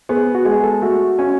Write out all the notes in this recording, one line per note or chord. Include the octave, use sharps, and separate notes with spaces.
B3 G#4
F#4
G#3 G#4
A4
A3 F#4
C#4